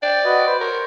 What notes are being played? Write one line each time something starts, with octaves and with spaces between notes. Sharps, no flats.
D5 G5
F#4 B4 D#5
B4 C5
A#4 C5 C#5